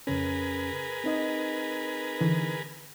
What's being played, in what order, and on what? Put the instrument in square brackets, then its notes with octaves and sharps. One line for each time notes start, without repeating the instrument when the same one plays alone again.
[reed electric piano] F2 C#3 C#4 [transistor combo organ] G#4 A#4 B4
[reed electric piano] C4 D#4 D#5
[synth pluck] D3 E3